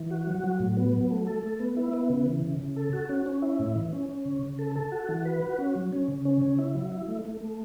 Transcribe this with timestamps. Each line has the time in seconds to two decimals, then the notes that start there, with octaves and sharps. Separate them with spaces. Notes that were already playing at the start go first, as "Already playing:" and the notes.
Already playing: E3
0.11 F#4
0.27 F#3
0.44 F#3
0.60 A2
0.77 B3
0.93 F#3
1.11 A3
1.27 A4
1.43 A3
1.60 B3
1.77 E4
1.93 B3
2.10 C#3
2.26 E3
2.43 C#3
2.60 C#3
2.76 A4
2.93 F#4
3.09 C#4
3.26 C#4
3.42 E4
3.59 A2
3.76 E3
3.93 C#4
4.09 C#4
4.26 C#3
4.43 C#3
4.59 A4
4.76 A4
4.92 F#4
5.09 E3
5.25 B4
5.42 F#4
5.59 C#4
5.75 F#3
5.92 C#4
6.08 C#3
6.25 C#4
6.41 C#3
6.59 E4
6.75 F#3
6.92 E4
7.08 A3
7.25 A3
7.41 A3